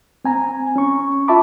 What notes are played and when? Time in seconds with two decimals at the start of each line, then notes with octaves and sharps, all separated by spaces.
0.25 C4 G#5 A#5
0.76 C#4 C#6
1.28 F4 E5 A5 B5 D6